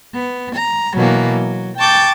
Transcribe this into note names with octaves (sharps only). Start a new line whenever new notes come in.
B3
A#5
B2 E3 F#3 A#3
F#3
G5 A5 C#6 D6 G6 A6